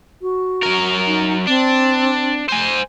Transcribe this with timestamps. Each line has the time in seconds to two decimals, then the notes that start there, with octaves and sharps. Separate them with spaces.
0.22 F#4
0.63 F#3 A#4
1.06 D#4
1.47 C4 D4
2.49 C5 G#5